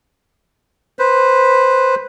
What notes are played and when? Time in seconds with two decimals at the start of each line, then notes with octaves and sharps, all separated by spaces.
0.99 B4 C5